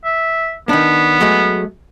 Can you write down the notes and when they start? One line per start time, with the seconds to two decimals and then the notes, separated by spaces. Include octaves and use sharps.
0.05 E5
0.69 D#3 B3 D4
1.21 F#3 G#3 A3